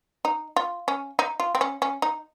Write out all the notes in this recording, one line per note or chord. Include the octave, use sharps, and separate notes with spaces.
D#4
F4
C#4
D#4
F4
C4
C#4
C#4
D#4